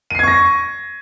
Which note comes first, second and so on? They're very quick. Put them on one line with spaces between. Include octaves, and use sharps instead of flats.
D#7 C7 G#6 C#6 A#6